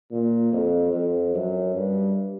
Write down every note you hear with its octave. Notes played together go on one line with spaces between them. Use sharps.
A#2
F2
F2
F#2
G2